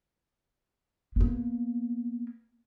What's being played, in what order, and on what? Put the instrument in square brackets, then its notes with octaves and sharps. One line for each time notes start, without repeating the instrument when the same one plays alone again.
[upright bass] A#3 B3